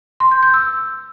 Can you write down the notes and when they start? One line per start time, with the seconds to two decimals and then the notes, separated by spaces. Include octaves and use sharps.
0.20 C6
0.31 G6
0.43 G6
0.54 E6